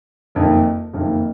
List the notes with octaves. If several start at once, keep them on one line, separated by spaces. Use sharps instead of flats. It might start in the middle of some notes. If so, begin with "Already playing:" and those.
F#1 F2 D#3 A#3
F#1 F2 D#3 A#3